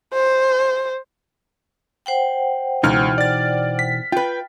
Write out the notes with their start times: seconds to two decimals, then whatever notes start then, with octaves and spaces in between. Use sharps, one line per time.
0.14 C5
2.06 C5 F#5 G5
2.83 C#2 B2 E3 D#4 F6
3.18 D5 A6
3.79 B6
4.12 F4 B4 G5